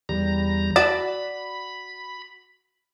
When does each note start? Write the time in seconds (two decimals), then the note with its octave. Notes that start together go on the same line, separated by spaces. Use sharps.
0.09 E2 G3 A#5
0.76 F#4 D5 A5 B5